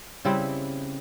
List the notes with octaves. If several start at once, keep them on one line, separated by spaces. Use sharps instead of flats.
C#3 G3 C4 E4